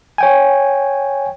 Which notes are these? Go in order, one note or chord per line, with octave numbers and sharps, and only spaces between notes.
C#5 G5 G#5